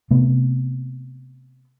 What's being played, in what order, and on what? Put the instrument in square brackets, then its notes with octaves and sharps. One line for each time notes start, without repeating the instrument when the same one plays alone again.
[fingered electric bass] C3 A3 B3